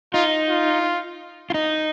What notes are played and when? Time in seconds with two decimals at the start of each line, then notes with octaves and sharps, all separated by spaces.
0.14 D#4 F4
0.49 F4
1.50 F4
1.54 D#4